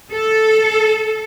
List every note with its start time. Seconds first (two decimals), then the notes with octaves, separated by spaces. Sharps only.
0.12 A4